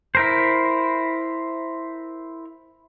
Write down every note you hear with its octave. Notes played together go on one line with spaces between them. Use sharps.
E4 A#4 C5